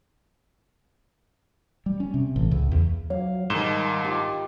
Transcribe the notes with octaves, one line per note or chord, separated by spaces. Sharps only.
G3
C#4
C3
A1
C#2
E2
F#3 F5
G#2 D#3 G3 A5 C6
D#4 G4